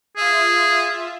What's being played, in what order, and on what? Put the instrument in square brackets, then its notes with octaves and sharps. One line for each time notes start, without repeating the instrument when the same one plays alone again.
[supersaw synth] F4 E5 [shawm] G#4